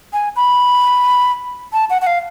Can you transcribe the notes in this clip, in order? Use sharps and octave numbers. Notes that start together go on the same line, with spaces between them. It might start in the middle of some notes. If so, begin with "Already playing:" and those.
G#5
B5
A5
F#5
F#5
F5